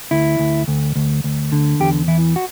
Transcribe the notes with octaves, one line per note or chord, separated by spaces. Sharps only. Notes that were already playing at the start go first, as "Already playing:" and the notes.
D2 E4
D2
D2
D2
D2
D3
E2 G4
E3 E4
F#4